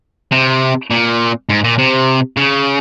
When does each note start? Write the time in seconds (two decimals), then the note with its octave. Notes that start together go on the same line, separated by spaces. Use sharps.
0.32 C3
0.91 A#2
1.49 G#2
1.64 A#2
1.78 C3
2.37 C#3